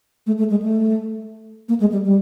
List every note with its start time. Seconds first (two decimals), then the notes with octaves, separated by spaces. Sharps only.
0.27 A3
0.38 A3
0.50 G#3
0.62 A3
1.69 A#3
1.80 G#3
1.92 G3
2.05 G3